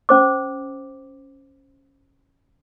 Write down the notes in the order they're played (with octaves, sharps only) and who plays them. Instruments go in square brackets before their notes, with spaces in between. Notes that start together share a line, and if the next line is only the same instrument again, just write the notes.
[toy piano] C#4 C5 D6